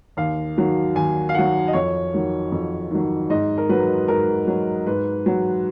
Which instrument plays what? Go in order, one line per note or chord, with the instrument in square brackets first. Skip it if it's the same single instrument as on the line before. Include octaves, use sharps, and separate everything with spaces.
[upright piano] D#2 F5
D#3 F#3
D#2 G#5
F5
D#3 F#3 F#5
D#5
F2 C#5
D#3 F#3
F2
D#3 F#3
G#2 D#5
A#4
F#3 B4
G#2 A#4
F#3
G#2 B4
F#3